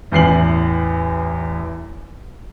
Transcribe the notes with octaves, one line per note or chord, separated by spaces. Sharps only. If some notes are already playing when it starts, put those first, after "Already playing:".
A1 E2 C7 F#7